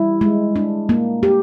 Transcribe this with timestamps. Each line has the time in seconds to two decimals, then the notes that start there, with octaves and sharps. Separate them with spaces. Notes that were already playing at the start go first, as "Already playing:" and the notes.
Already playing: G3 E4
0.21 G#3
0.56 D4
0.89 A#3
1.23 G4